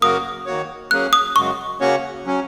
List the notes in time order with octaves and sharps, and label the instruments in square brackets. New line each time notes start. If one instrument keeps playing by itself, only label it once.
[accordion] F#2 C#3 A#3 F#4 A#4 [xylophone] D#6
[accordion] D#3 A#3 F#4 C#5
[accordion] F#3 A#3 C#4 G#4 [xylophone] F#6
[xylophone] D#6
[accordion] F#2 C#3 G#3 F#4 [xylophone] C#6
[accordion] C#3 A#3 C#4 F#4 C#5
F#3 C#4